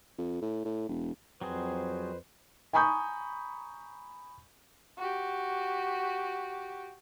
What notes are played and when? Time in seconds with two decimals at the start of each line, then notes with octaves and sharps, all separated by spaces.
0.18 F2
0.42 A2
0.65 A2
0.88 E1
1.41 F2 F#3 C4 G#4 B4 C5
2.73 G#5 A#5 B5 C#6 D#6 G6
4.98 F#4 G4